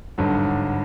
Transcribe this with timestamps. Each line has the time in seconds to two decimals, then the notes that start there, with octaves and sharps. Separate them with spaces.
0.18 G#1 G2 D3 F#3